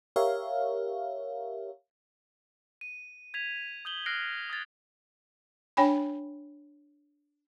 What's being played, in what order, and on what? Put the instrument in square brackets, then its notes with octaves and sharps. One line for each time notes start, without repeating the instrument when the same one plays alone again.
[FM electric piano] G4 A#4 C#5 E5 F5
[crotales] D#7
G#6 B6 F7
D#6 G6 F#7 G7
F6 F#6 A#6 C7 D7
D#6 G#6 A6
[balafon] D4 C#5 G5 G#5 B5